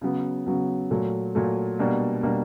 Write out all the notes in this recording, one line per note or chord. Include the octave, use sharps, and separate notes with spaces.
C#3 F#3 B3
C#3 F#3 B3
A#2 F#3 A3
A#2 F#3 A3
B2 G3 A#3 D4
B2 G3 A#3 D4